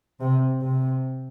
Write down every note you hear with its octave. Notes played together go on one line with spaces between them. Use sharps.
C3
C3